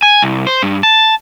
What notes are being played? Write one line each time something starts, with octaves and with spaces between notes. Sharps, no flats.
G#5
C2
C5
G2
A5